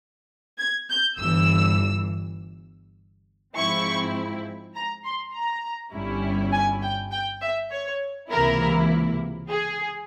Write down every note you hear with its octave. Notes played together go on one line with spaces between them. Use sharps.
G#6
G6
G1 G2 E3 E6
G#2 F3 C4 E4 C#6
A#5
C6
A#5
G1 G2 G3 C#4 E4
G#5
G5
G5
E5
C#5
C#2 C3 E3 A#3 E4 A#4
G#4